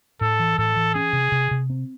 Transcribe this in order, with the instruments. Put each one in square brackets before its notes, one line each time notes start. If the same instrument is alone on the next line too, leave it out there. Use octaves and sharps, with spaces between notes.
[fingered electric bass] A2 [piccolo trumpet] A4
[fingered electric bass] E3
[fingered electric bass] A2 [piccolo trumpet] A4
[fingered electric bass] E3
[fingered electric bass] C#4 [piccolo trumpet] G#4
[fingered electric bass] C3
C3
C3
C4